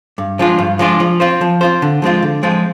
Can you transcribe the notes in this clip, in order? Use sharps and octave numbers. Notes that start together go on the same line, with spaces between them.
G2
F3 G#3 D4 F4
G2
F3 G#3 D4 F4
F3
C4 F4 C5
F3
C4 F4 C5
D3
F3 G#3 C4 F4
D3
F3 G#3 C4 F4